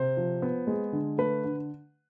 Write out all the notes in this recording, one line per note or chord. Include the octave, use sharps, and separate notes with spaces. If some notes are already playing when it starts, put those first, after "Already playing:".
Already playing: C3 C5
F3
B3
G#3
D3
A3 B4
D3